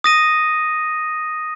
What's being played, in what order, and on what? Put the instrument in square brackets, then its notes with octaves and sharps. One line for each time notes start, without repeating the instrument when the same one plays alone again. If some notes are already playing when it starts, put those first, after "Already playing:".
[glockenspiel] D#6 A#6 D#7